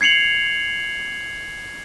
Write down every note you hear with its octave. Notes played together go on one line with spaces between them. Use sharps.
G#6 C7 C#7 F7 F#7